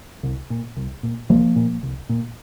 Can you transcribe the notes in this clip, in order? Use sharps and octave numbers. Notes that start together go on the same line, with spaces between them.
C2
A#2
C2
A#2
C2 F3 A#3
A#2
C2
A#2